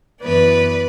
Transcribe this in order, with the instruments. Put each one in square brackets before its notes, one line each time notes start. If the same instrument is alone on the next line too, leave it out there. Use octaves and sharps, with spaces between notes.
[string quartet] F#2 E3 B3 B4 D5